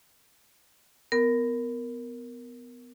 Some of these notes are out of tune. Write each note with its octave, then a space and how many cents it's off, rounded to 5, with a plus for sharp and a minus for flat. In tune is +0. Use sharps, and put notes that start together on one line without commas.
B3 +20 A#4 +0